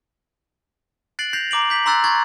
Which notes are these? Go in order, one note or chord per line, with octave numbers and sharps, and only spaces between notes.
F#6 A6 C7 D7 F#7
G6 A#6 C7 F7
A#5 D6 D7 F#7
G6 B6 F#7
A#5 C6 E6 F#6 A6
C#6 F#6 G#6 A6